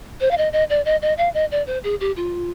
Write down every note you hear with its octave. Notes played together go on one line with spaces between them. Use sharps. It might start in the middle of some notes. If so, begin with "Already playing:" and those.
C5
F5
D#5
D#5
D5
D#5
D#5
F5
D#5
D5
C5
G#4
G4
F4